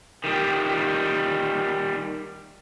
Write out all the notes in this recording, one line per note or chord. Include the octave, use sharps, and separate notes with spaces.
D#3 G3